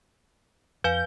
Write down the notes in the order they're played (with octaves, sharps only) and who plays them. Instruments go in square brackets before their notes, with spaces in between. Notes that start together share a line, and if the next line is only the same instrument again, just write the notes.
[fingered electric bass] F2 [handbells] B4 F5 G#5 [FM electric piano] G6